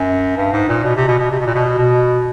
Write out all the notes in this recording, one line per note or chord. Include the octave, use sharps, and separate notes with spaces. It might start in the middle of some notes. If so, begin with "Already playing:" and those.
Already playing: F#2
G2
G#2
A#2
B2
C3
B2
B2
C3
B2
A#2
B2
B2